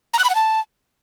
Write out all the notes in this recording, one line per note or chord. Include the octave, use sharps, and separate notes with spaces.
A#5
F#6
B5
F#5
A5